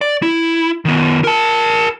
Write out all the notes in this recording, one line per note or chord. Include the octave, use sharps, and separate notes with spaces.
D5
E4
D#3 B3
A#4 A5